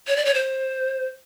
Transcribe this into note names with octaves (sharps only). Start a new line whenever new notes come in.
C#5
D5
C#5
C5